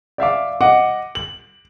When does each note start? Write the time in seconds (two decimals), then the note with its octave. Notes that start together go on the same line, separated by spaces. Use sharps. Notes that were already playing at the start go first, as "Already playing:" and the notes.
0.18 D5 E5 F5 D6
0.61 D#5 F#5 D6
1.15 F#7